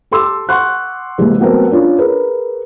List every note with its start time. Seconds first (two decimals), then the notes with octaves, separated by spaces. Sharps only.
0.11 G4 A4 C6 D6 E6
0.49 F#5 C6 C#6 F#6
1.18 C3 E3 G3 G#3 A#3
1.40 F#3 A3 B3 C4 A#4
1.71 C#4 D4 F4
1.98 G#4 A#4 B4